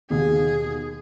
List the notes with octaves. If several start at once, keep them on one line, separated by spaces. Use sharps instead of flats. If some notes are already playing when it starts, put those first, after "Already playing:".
D#2 B2 G#4